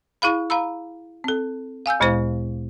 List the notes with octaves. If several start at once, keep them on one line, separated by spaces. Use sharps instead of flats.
E4 G#4 F5 B5
F5 A#5 B5 E6
C4 A4
F5 G#5 E6 G6
D2 A#2 G#3 E4 C5